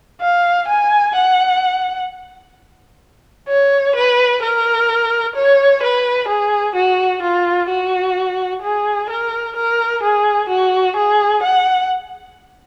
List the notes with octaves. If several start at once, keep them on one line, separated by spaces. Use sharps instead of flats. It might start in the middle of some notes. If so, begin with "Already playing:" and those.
F5
G#5
F#5
C#5
B4
A#4
C#5
B4
G#4
F#4
F4
F#4
G#4
A#4
A#4
G#4
F#4
G#4
F#5